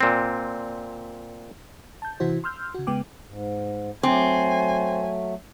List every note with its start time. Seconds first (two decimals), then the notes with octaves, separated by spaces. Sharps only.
0.01 A#2 C4
2.02 A5 G6
2.20 C3 E3 E4 F#4 C5
2.44 C6 E6 F6 G6
2.74 C#3 F#4
2.87 C#3 G#3 B3 G5 D6
3.27 G#2
4.03 F#3 A3 C4 G#5